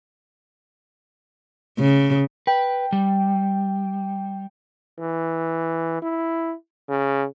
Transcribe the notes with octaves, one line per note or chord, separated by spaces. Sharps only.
C#3
B4 G5
G3
E3
E4
C#3